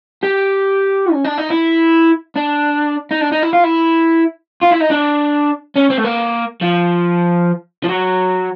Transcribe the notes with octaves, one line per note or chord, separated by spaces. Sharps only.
G4
C#4
D4
D#4
E4
D4
D#4
D4
D#4
E4
F4
E4
F4
E4
D#4
D4
C#4
C4
A3
A#3
F3
F3
F#3